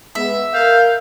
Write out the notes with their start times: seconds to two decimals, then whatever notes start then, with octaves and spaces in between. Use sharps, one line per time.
0.15 G#3 B3 E5
0.54 A#4 F5 G6